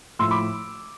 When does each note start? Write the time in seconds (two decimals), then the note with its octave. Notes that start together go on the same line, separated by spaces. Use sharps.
0.19 A2 F3 C6 E6
0.31 B5 D6